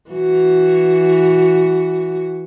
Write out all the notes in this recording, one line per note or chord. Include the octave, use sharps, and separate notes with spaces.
E3 F#4